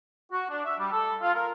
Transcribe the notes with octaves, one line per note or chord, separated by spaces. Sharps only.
F#4
D4
E5
G3
A4
F4
A#4